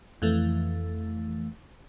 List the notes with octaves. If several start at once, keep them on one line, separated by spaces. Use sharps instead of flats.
F2 E3 A3